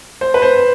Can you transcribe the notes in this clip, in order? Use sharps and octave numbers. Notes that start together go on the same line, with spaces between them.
C5
B4
C5